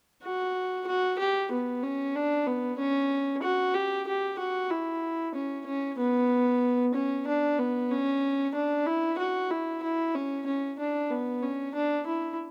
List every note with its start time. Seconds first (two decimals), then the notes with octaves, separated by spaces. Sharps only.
0.23 F#4
0.87 F#4
1.18 G4
1.51 B3
1.83 C#4
2.15 D4
2.47 B3
2.78 C#4
3.42 F#4
3.74 G4
4.07 G4
4.39 F#4
4.70 E4
5.35 C#4
5.66 C#4
5.99 B3
6.94 C#4
7.27 D4
7.59 B3
7.91 C#4
8.54 D4
8.86 E4
9.18 F#4
9.50 E4
9.83 E4
10.15 C#4
10.46 C#4
10.79 D4
11.11 B3
11.42 C#4
11.75 D4
12.06 E4